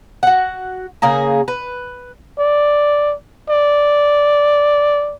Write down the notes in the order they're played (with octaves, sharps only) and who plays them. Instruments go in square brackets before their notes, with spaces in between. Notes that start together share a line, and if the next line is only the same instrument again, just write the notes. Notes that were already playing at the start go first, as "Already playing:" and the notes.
[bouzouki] F#4 F#5
C#3 A#3 G#4 A#5
B4
[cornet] D5
D5